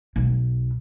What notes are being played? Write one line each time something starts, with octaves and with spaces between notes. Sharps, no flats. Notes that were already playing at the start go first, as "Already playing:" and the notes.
B1